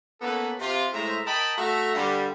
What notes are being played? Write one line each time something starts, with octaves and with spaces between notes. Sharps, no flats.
A#3 B3 C#4 A4 B4
C3 F4
A2 G#3 C5 E5 A#5
A#4 D#5 G5 A5 B5
A3 F#4 A4 E5 A#5
G2 D3 G3